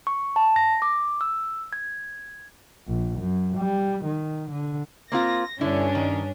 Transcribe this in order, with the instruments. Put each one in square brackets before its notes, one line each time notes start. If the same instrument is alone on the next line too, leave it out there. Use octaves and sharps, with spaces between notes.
[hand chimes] C#6
A5
A#6
D6
E6
G#6
[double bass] A#1
F#2
G3
D#3
D3
[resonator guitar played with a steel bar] A#3 C4 F4 [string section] A#6
[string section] G2 C#4 D4 [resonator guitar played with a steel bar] D3 E4
[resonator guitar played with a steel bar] D#3